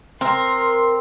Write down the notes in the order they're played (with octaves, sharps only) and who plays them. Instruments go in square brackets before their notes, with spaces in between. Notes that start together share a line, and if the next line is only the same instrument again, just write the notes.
[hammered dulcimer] C4 [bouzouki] A#4 [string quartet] C6